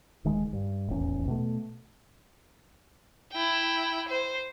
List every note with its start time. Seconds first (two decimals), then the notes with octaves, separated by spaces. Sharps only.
0.24 D#1 D#3 G#3
0.53 G2
0.88 D#1 A1 E2 C#4
1.27 B2 A3
3.32 E4 G5
4.08 C5